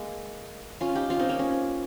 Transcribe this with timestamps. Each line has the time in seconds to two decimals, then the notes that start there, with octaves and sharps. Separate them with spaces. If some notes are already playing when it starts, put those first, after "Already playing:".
Already playing: G#3 A#3
0.81 C#4 F4
0.95 D#4 G4
1.10 C#4 F4
1.19 C4 D#4
1.29 A#3 C#4
1.39 A#3 C#4